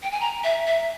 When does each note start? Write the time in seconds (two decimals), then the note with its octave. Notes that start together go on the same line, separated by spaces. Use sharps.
0.03 G5
0.11 G#5
0.20 A#5
0.44 E5
0.67 E5